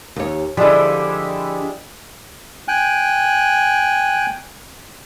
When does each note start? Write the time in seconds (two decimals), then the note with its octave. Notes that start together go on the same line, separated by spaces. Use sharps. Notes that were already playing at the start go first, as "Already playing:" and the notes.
0.16 D#2 C#5
0.57 D3 F3 G3 G#3 E4
2.68 G5 G#5 F#6